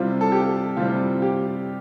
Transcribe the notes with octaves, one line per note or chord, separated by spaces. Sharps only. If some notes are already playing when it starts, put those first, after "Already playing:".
Already playing: C3 G3 C4 E4 F4
A4
G4
C3 G3 C4 E4 F4
G4